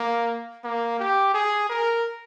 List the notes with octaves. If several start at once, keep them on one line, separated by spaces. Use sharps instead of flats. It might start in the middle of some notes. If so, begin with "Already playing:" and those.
Already playing: A#3
A#3
G4
G#4
A#4